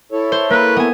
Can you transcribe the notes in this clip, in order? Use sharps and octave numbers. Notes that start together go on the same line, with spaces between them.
E4 A4 C#5
C5
A#3 B4
B3 G#5